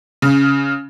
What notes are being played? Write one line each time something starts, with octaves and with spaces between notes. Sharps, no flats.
C#3